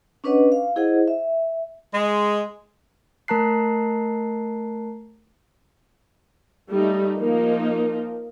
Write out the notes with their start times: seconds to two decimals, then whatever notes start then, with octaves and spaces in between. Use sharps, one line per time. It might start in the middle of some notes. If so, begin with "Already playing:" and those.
0.24 C#4 D4 B4 C#5 D#5 F#5
0.52 F5
0.76 E4 G#4 C5 D#5 F#5
1.08 E5
1.94 G#3
3.28 A3 A#4 A5 A#5 F#6 C7
6.72 G3 A3 D#4
7.19 F3 A#3 D#4